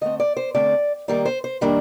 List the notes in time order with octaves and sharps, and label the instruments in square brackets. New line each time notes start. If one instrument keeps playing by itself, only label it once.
[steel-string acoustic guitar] D3 A3 C4 D#5
D5
C5
D3 A3 C4 D5
D#3 G3 A#3 D5
C5
C5
D#3 G3 A#3 D4